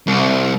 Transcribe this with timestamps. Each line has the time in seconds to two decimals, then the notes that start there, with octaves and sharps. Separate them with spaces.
0.07 C2